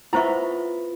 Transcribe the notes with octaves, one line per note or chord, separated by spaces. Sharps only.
B3 E4 F4 C5 E5 F#5 A#5 C#6